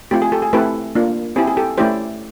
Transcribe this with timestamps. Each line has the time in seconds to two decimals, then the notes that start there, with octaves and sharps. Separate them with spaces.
0.11 A3 C4 F4 G4
0.22 G#4
0.32 G4 A4
0.42 G#4
0.53 A3 C4 E4 G4 A4 B4
0.95 A#3 D4 F4
1.36 C4 E4 G4 G#4
1.47 G#4
1.57 G4 A4
1.78 A3 C#4 E4 G4 C5 D5